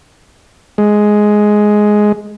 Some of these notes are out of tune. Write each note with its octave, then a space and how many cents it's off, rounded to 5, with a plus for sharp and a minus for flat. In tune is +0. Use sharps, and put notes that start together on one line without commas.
G#3 +10